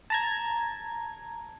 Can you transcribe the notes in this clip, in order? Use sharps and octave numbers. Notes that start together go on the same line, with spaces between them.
A5 A#5 G#6